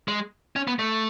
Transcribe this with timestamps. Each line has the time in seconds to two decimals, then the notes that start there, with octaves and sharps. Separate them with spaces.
0.08 G#3
0.56 C#4
0.67 B3
0.79 A3